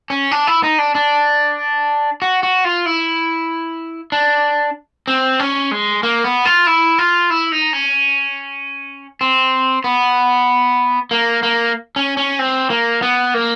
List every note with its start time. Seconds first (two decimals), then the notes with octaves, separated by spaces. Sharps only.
0.10 C#4
0.31 D4
0.47 E4
0.63 D#4
0.78 D4
0.95 D4
2.22 F#4
2.43 F#4
2.64 F4
2.86 E4
4.12 D4
5.08 C4
5.40 C#4
5.71 G#3
6.03 A#3
6.24 B3
6.45 F4
6.67 E4
6.99 F4
7.30 E4
7.52 D#4
7.73 C#4
9.21 C4
9.84 B3
11.11 A#3
11.43 A#3
11.96 C#4
12.17 C#4
12.39 C4
12.70 A#3
13.02 B3
13.34 A#3